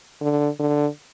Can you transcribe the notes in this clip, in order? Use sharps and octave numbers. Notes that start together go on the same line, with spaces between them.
D3
D3